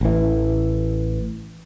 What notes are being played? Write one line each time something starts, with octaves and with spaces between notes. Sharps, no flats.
A1 E3